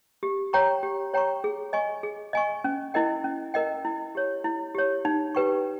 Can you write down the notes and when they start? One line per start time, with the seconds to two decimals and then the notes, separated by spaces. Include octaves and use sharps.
0.23 G4
0.53 C#5 G5 A#5 C#6
0.83 G4
1.14 C#5 G5 A#5 C#6
1.44 G#4
1.73 D#5 G#5 C#6
2.03 G#4
2.33 D#5 G#5 C#6
2.64 C#4
2.94 E4 A#4 D#5 G5
3.24 C#4
3.54 E4 A#4 D#5 G5
3.85 E4
4.15 G4 C#5
4.44 E4
4.75 G4 C#5
5.05 D#4
5.35 G4 B4 G5 C#6